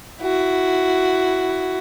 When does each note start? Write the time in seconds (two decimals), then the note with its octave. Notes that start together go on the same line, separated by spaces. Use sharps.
0.21 E4 F#4